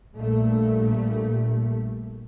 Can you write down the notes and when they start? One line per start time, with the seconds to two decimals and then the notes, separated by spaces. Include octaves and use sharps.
0.16 A#1 A#2 G3 A3